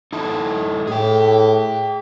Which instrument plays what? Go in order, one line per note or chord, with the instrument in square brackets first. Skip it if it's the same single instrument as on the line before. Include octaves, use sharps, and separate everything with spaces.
[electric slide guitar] D#4 E4 A4
[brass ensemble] A2 [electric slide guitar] G#4 G5